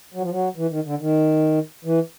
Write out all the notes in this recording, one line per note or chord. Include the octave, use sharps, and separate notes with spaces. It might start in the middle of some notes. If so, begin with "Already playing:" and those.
F#3
F3
F#3
E3
D#3
D3
D#3
E3